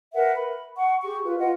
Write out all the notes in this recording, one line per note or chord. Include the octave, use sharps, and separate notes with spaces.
A#4 B4 E5 F#5
B5
F#5 C#6
G4 G#4 C#6
F4 B4
F4 D#5 F#5